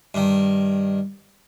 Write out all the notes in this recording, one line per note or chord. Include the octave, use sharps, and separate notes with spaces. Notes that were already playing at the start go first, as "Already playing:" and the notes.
G2 D#3